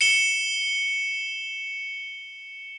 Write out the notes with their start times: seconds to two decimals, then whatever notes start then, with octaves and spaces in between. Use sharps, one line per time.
0.01 C#7 E7 G7